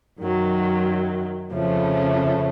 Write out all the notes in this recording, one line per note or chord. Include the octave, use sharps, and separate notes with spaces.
F#2 D#3 F#3
F2 C#3 F3 A3 C#4